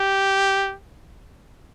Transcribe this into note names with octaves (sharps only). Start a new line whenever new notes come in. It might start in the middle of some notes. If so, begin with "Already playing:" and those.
Already playing: G4